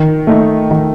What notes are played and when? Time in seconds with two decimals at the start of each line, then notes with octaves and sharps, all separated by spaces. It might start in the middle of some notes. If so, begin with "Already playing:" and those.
Already playing: D#3
0.27 A3 D#4
0.71 D#3